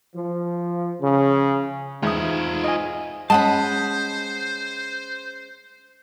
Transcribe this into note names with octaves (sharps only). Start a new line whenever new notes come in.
F3
C#3
E2 G#2 G#3 F4 E5 D#6
D#5 G#5
G#3 C#4 C5 D#5 F#5 A5 B5